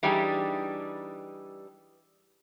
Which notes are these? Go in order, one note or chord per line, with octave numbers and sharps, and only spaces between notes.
E3 G3 D4 D#4 G4 G#4